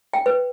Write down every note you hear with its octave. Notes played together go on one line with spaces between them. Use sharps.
G5
B4